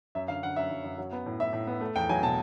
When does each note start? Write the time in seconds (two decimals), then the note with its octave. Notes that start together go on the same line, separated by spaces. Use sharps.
0.15 F#2 E5
0.28 D3 F5
0.43 D3 F#5
0.56 F#2 E5
0.71 F#2
0.84 F#2
0.98 F#3
1.12 B3
1.26 A2
1.40 A2 E5
1.53 A2
1.67 B3
1.81 A3
1.96 E2 G5
2.09 F#3 G#5
2.23 B2 A5